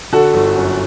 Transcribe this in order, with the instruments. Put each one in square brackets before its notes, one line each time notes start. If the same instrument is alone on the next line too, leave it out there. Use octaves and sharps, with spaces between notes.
[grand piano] D3 F#4 A4
G1
F#2